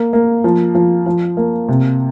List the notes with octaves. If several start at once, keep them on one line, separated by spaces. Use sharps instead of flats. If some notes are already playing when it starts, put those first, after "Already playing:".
Already playing: A#3
A#3
F3
F3
F3
A#3
C3